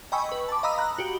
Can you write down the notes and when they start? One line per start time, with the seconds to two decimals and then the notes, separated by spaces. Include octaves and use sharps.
0.12 D#5 G5 G#5 B5 C#6 E6
0.29 B4 C#6
0.49 A5 D6
0.63 D#5 F5 A#5 B5 D#6 E6
0.78 A#5 B5 F#6
0.98 F#4 G4